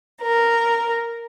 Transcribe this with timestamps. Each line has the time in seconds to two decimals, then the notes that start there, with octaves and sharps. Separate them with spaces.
0.22 A#4